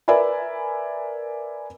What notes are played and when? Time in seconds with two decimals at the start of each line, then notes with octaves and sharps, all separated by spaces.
0.08 A#4 B4 D5 E5 G#5 B5